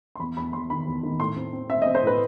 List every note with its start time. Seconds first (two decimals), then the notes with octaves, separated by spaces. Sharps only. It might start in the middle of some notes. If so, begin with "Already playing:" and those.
0.15 C6
0.20 E2 B5
0.37 E2 B5
0.53 E2 C6
0.70 D#3 B5
0.87 E2
1.03 D#3
1.19 A2 C6
1.36 C4
1.53 C4
1.69 C4 E5
1.82 D#5
1.86 C4
1.95 C5
2.03 A2 B4